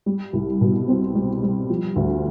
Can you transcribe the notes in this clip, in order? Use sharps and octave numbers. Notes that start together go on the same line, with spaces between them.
G3
C2
B2
C4
G3
G3
F3
D2